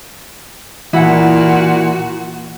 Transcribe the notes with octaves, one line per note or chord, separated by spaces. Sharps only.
A#2 E3 E4 F#4 F#5